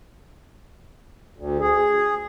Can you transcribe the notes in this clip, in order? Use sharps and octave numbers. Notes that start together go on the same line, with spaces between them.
D2
G#4